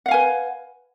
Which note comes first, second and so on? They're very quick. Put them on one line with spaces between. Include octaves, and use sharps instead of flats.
F#5 F5 G#5 B4